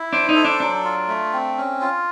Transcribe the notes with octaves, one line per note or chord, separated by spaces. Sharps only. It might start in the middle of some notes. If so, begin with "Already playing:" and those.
Already playing: E4
D4 C5
D#4
A4
D4
F#3 D4
F4
A3
C4
C#4
F4